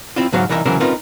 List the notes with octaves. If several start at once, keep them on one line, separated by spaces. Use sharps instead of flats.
C4 E4 F4
C#2 G#2 F#3 F#4 C5 F5
C2 E3 D#4 A#4 C#5 E5
C#3 E3 F#3 C#4 A#4 C5
C4 C#4 D#4 F4 A#4 B4